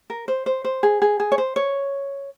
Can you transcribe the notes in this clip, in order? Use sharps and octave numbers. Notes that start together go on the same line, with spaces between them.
A#4
C5
C5
C5
G#4
G#4
G#4
C#5
C5
C#5